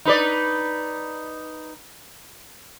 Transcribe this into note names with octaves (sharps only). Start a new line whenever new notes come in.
D#4 B4 D5